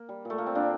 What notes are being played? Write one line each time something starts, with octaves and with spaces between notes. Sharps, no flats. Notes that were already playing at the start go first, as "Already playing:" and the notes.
Already playing: A#3
G3
A#2 A3
A#2 A#3
C4
A#2 A#3 D4